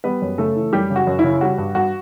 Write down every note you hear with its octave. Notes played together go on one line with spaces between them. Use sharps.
G3 B3 B4
F#2
C#3 A3 A4
E3
F#2 G3 G4
C#3
F#4
F#2
C#3 E4
G3 F#4
G2
G2 F#4